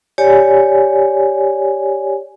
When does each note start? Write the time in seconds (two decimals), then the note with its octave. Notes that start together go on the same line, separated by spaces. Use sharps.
0.18 G4 C#5 D5 G#5